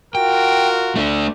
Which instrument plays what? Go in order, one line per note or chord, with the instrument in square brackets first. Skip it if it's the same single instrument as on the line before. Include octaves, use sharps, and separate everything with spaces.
[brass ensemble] F4 F#4 A#4 [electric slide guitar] G5
[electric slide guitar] A3 D4